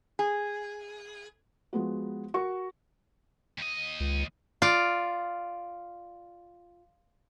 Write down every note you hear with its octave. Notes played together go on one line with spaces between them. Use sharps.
G#4
F3 G#3 B3 F#4
F#4 A#4 C#6
D#2 D#5
C#2
F4 D5